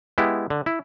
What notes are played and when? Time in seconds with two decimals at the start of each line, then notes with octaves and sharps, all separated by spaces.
0.18 G#3 B3 E4 G4
0.50 D3
0.66 E4